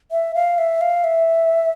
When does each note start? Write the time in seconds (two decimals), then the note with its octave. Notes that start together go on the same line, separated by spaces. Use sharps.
0.11 E5
0.35 F5
0.58 E5
0.81 F5
1.04 E5